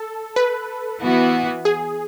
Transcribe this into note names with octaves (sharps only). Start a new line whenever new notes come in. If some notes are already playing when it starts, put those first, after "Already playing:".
Already playing: A4
B4
E3 B3 F#4
G#4